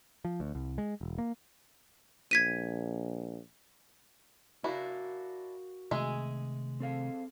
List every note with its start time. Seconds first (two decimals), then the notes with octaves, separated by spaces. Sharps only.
0.25 F3
0.40 D2
0.55 C2
0.78 G#3
1.01 E1
1.18 A#3
2.31 A#1 G#6 B6 D#7
4.64 D4 E4 F#4 A#4 F5
5.91 C3 D#3 G#3 A3 G#4 E5
6.80 C4 A4 F5